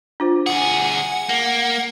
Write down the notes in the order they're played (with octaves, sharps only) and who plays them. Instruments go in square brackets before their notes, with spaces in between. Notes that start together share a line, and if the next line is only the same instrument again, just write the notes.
[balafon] D4 F4 C5
[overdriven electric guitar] D2 G#4 [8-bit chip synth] F#5
[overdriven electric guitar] A#3